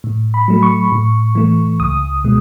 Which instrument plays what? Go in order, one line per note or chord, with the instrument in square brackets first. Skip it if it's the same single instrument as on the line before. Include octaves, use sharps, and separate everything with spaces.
[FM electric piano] A2
B5
F#3 A3
C#6
A2
E3 A3
C#2 D#6
B2 G#3